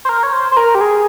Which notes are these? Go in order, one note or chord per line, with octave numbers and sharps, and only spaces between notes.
C5
A#4
C#5
C5
C5
A#4
G4
G#4